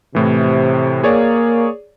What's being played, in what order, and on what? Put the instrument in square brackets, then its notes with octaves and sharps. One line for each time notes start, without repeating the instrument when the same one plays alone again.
[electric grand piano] A2 E3 [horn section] C3
[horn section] A#3 [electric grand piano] G#4 C#5 D5